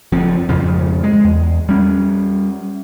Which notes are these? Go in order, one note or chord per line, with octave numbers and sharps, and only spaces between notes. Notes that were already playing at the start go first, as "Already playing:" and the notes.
F#1 F3 C4
F2 G#2 C#3 F3
G#3
E2
G3 C#4